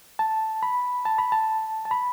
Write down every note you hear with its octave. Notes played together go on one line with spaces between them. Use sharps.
A5
B5
A5
B5
A5
A5
B5